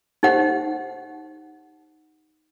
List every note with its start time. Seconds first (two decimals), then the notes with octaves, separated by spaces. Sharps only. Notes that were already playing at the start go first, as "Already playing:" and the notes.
0.23 D#4 G4 C5 F#5